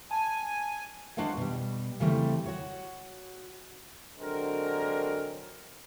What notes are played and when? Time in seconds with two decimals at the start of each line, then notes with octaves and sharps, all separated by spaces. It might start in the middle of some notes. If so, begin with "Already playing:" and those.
0.11 G#5 A5
1.17 G#3 D4 F#4 C5 F5 F#5
1.37 B2 G3
2.00 C#3 E3 G3 A3 C4
2.46 F#4 C#5
4.19 D3 F#3 G#3 C4 A#4